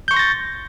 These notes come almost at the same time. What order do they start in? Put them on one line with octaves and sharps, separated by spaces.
G6 C#6 C6 A#6 A6